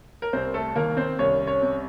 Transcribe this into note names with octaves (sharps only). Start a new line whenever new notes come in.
A#4
C2 C4 C5
A3 A4
D#3 A#3 A#4
C4 C5
C2 C#4 C#5
C#4 C#5
C3